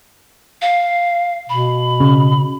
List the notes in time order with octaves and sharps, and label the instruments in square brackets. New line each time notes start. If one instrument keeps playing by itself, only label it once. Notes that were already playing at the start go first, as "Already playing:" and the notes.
[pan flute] F5
[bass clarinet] B2 [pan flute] B5
[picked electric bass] C#3